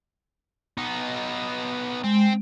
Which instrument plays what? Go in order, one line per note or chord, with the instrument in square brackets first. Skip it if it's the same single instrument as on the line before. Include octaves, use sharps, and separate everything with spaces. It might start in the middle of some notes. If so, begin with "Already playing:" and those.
[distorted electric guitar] B3 D#4
[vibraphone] G#3 [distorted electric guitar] C4